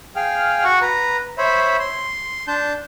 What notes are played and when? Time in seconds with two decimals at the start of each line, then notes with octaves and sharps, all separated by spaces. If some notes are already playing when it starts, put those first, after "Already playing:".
0.16 G#4 F5 G5 F6
0.64 F#4 F#5 C#6
0.82 B4 A#5
1.38 C5 C#5 E5 B5
1.80 C6
2.48 D4 A5 G6